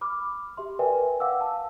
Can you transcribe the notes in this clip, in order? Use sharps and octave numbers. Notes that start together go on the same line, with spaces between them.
B5 D6 F6
G4 E5 C6
A#4 B4 D5 E5 G5 G#5
F5 F#5 D6 E6
A5